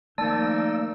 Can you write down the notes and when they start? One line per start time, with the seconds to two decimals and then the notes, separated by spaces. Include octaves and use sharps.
0.18 D#3 F3 A3 A#3 D#4 D5 A5 E6